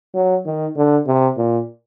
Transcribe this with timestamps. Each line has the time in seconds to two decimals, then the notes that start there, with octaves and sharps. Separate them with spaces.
0.14 F#3
0.46 D#3
0.76 D3
1.07 C3
1.37 A#2